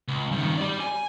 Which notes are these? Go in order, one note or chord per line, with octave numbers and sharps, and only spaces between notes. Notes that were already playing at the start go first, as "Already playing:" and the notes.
C#2
G2 D#3
G4 D5
G#5